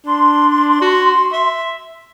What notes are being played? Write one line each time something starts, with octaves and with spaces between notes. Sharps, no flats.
D4 C6
F#4
E5